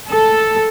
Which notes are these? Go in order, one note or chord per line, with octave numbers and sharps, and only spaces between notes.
A4